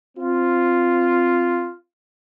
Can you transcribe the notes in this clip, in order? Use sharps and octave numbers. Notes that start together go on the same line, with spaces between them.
C4 F4